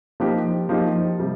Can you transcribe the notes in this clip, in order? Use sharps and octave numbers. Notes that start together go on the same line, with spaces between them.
F3 A#3 D#4 G4
F3 A#3 D#4 G4
C3 G3